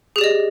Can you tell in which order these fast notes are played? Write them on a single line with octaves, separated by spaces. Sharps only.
G#4 G4 D5 D#5